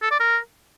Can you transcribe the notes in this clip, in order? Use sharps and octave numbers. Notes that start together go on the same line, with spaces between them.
A4
D5
A#4